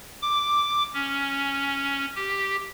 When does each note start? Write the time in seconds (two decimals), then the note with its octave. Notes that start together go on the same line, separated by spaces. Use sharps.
0.22 D6
0.93 C#4
2.15 G4